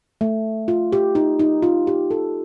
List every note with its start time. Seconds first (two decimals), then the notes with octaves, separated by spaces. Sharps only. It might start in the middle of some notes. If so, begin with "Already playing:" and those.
0.21 A3
0.68 F4
0.92 G4
1.15 D#4
1.39 D#4
1.63 F4
1.87 G4
2.11 A4